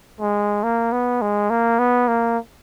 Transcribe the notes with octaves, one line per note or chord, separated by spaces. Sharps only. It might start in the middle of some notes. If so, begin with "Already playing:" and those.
G#3
A#3
B3
G#3
A#3
B3
A#3